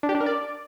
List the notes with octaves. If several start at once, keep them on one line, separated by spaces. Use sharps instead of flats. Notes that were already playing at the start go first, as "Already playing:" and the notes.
D4
G4
D4
A#4
D5